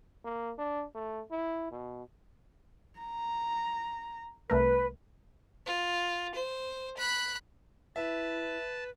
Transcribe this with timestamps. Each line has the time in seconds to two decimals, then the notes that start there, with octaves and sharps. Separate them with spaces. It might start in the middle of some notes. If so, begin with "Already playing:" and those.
0.24 A#3
0.59 D4
0.95 A3
1.31 E4
1.72 B2
3.00 A#5
4.50 C2 A3 A#4 B4
5.66 F4
6.35 C5
6.97 B5 F#6
7.96 E4 B4 E5 A5